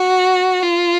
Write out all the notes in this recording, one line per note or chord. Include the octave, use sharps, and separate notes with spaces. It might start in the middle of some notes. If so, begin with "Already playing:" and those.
Already playing: F#4
F4